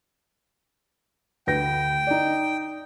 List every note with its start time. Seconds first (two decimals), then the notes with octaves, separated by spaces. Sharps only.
1.47 D2 B4 G5 A#6
2.07 D#4 D5